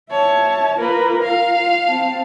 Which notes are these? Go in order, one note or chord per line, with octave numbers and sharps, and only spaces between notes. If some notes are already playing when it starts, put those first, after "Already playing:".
C#5 E5 A5
A#3 F4 A#4 B4
F5
F4
C4 A5